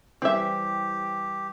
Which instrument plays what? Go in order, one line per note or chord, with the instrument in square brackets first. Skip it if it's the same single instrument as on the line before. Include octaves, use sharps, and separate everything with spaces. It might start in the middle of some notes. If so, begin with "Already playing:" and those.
[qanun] E3 G3 [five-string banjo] C4 E5 [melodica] G4